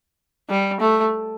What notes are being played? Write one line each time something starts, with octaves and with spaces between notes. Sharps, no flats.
G3
A3